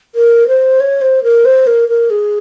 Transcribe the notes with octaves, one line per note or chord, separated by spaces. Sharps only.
A#4
C5
C#5
C5
A#4
C5
A#4
A#4
G#4